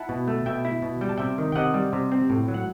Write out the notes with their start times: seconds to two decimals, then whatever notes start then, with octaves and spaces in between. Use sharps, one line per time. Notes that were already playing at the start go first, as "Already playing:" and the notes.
Already playing: E4 F#5 A5
0.09 B2
0.28 A3
0.46 B2 E5 G5
0.65 E4
0.82 B2
1.01 G3 G5
1.09 A5
1.18 C3 E5 G5
1.38 D#3
1.52 G5
1.55 C3 D#5 F#5
1.74 G3
1.93 C3
2.12 C4
2.30 A2
2.48 F#3
2.54 F#5